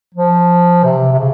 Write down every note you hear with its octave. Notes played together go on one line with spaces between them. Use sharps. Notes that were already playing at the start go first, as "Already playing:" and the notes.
F3
C3
C3
C#3